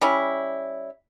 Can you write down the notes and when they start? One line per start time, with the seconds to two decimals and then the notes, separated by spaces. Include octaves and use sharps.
0.01 G3 C#4 E4